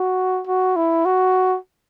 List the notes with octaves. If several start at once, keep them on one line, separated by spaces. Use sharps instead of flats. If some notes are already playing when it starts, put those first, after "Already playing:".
Already playing: F#4
F#4
E4
F#4